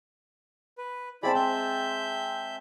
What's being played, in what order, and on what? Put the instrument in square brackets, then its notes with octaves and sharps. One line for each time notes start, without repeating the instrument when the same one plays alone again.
[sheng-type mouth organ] B4
[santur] G#3 C4 A5 [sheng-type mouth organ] E4 D5 B5
[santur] C4 [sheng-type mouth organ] E5 G6